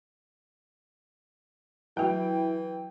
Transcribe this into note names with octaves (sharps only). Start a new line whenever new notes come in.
E3 F#3 E4 F#4 G5